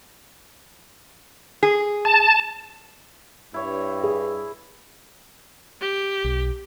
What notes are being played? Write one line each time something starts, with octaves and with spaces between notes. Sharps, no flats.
G#4
A5
G2 E4 C#5
G#4
G4
B1